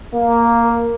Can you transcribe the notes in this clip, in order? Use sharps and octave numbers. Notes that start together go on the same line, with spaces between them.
A#3